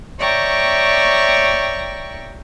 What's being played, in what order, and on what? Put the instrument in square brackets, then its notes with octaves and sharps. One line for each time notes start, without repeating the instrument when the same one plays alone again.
[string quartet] C#5 D5 E5 G5 A#5 C#6